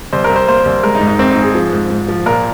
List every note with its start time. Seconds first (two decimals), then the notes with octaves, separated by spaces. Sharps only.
0.13 C2 C5
0.24 A#4
0.29 C2
0.36 C5
0.48 A#3 C5
0.65 C2
0.83 G#3 A#4
0.95 D#4
1.01 G#2
1.07 D#4
1.19 G#2 C4
1.30 D#4
1.37 G#2
1.42 G#4
1.55 F3
1.72 G#2
1.90 G#2
2.08 F3
2.26 A#2 A#4